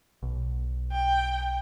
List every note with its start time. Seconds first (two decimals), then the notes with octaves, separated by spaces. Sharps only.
0.23 B1
0.92 G5